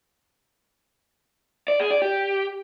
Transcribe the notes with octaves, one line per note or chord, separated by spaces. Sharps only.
D5
G#4
D5
G4